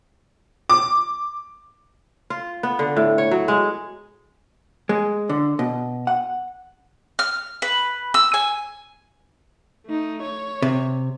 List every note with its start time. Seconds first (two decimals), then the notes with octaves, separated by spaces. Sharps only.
0.69 D6
2.30 F4
2.63 B3
2.79 D3
2.97 A2
3.18 C#5
3.31 F#3
3.48 G#3
4.89 G#3
5.29 D3
5.59 B2
6.07 F#5
7.19 F6
7.62 B4
8.14 E6
8.34 G#5
9.86 A3 D#4
10.22 C#5
10.62 C3